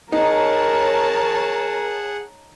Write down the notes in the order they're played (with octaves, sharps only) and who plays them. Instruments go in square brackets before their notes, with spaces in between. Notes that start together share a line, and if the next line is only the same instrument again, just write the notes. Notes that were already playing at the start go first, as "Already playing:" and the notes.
[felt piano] D#4 [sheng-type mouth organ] G#4 F#5 [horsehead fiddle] A#4 [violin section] C#5 A5